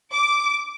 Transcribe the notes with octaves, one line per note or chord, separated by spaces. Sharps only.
D6